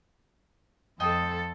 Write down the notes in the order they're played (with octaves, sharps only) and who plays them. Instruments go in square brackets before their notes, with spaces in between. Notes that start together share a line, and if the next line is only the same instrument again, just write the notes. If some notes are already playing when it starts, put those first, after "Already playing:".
[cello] F2 A4 [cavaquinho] D#5 G5 C6